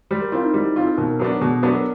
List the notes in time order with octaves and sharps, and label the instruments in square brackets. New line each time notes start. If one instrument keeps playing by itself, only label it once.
[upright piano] G3 [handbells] C5
[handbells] A#4
[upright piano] C4 F4 [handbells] E4
[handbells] D#4
[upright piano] G3 [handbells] E4
[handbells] D#4
[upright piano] C4 F4 [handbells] D#4
[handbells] A4
[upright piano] B2 [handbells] A#4
[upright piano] F#3 B3 D4
[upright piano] B2 [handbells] G#4
[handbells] A4
[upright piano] F#3 B3 D4 [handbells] A#4
[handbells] A4